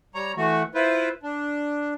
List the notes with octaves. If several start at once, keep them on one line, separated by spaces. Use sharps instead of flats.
G3 C#5 A#5
E3 A3 F#4
E4 F4 B4 C5
D4